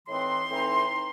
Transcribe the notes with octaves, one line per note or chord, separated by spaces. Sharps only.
A2 E3 C4 D#4 C6
A2 E3 C4 D#4